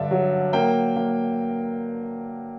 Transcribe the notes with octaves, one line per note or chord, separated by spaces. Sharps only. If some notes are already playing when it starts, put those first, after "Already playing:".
Already playing: G2 D3 D5 E5
F#3
A#3 G5
A#3